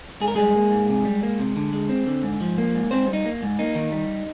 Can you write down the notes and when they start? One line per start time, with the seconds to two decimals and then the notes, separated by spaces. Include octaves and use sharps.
0.21 G#2 G#4
0.28 A#4
0.35 G3 G#3 G#4
0.55 A#3
0.71 G#2
0.89 C3
1.05 G3
1.23 A#3
1.39 C3
1.56 D3
1.73 G#3
1.89 C4
2.06 D3
2.23 G#2
2.41 F3
2.58 A#3
2.74 G#2
2.91 G#2 C4 C5
3.08 G3
3.13 D#4
3.26 A#3
3.43 G#2
3.59 A#3 D#4
3.75 D#3
3.92 G3